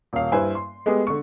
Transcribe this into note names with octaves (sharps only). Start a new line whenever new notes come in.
D#1 F5
G2 E4 B4 C5 G#5
C6
G#3 A3 B3 G4 G#4
D3 C#6